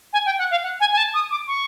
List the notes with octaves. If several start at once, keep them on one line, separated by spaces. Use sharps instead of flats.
G#5
G5
F#5
F5
F#5
G#5
G#5
A5
D#6
D6
C#6